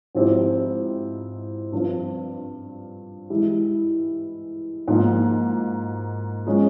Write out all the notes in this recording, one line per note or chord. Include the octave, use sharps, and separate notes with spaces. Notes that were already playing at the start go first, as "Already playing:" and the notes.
G#2 F3 C4 E4 G4
G2 F3 C4 F4
E3 G#3 E4 G4
G#2 F3 A#3
F3 G#3 C#4